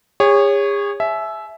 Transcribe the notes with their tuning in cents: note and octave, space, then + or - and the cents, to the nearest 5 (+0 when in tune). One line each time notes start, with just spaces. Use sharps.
G#4 -40 C#5 +0
E5 +0 G#5 +45